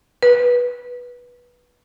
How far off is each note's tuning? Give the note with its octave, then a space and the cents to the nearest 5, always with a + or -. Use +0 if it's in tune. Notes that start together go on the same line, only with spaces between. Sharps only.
B4 -15